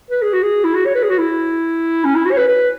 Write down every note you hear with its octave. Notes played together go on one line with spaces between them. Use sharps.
B4
G#4
F#4
G#4
E4
F#4
C#5
B4
G#4
F#4
E4
C#4
E4
F#4
C#5
B4
B4